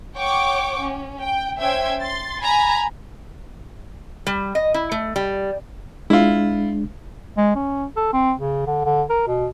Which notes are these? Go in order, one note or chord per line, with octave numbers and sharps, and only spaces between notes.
C#5 F#5 G5 C#6 D6
C#4
G5
C#4 C5 E5 G5 E6 G#6
C6 A6
G#5 A#5 B5
G3
D#5
E4
A3
G3
G#3 D4 E4 F4
G#3
C#4
A4
C4
C#3
D3
D3
A#4
B2